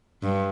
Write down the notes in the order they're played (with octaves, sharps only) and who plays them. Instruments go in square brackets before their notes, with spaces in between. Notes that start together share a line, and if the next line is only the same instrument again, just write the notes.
[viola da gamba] G2